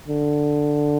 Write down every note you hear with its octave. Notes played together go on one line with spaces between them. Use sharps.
D3